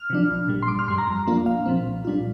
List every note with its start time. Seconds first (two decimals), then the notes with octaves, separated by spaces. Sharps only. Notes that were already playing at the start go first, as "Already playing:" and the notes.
Already playing: F6
0.10 C3 F3 D4
0.30 A#1
0.48 A#2 G3
0.62 C6
0.68 G1 D6
0.79 F6
0.88 G2 G3 C6
0.98 A#5
1.08 F2
1.27 F3 A#3 D4 F4
1.46 A#1 F5
1.66 A#2 F3 C4
1.86 C2
2.05 A#2 G3 D4 F4